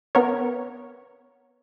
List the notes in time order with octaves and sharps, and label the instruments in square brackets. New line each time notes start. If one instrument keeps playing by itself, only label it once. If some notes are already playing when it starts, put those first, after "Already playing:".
[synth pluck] B3 A#4 C#5